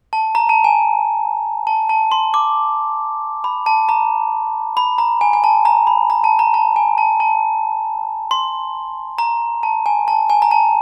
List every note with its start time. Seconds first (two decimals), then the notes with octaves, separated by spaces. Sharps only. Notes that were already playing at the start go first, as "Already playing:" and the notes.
0.13 A5
0.35 A#5
0.49 A5
0.64 G#5
1.67 A5
1.89 A5
2.12 C6
2.34 D6
3.44 B5
3.66 A5
3.89 A#5
4.77 B5
4.98 A#5
5.21 G#5
5.33 G#5
5.44 A5
5.65 A#5
5.87 B5
6.10 A#5
6.24 A5
6.39 A#5
6.54 A5
6.76 G#5
6.98 A5
7.20 A5
8.31 C6
9.18 A#5
9.63 A5
9.86 G#5
10.08 A5
10.30 G#5
10.42 A#5
10.51 A5